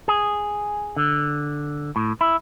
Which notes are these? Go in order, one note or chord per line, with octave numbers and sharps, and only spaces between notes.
G#4
D3
A2
E4